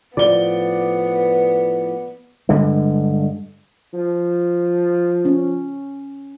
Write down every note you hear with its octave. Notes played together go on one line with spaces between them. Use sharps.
A2 F3 B3 D5 G7
G2 D3 G#3
F3
C#4